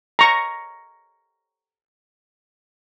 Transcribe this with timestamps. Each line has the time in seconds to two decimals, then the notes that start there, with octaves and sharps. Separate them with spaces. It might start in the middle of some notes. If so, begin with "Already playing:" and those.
0.19 A#5 C#6